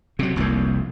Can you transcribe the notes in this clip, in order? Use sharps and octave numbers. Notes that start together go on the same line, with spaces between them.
C3 F#3
F1 C2 F2 A#3